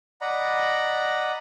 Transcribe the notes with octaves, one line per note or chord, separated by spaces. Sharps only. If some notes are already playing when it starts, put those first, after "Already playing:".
D5 D#5 F#5 A#5 B5